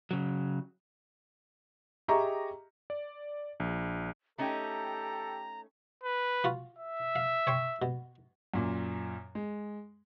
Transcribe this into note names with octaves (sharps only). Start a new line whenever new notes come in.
C#3 F#3
G4 G#4 D#5 E5 A#5 C#6
D5
A#1
A3 C#4 D#4 G4 A4 G5 A#5
B4
F4 F#4
E5
F5
C#5 G5 C6
B2
F#2 A#2
G#3